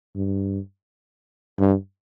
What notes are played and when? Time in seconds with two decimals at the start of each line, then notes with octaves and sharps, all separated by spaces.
0.16 G2
1.59 G2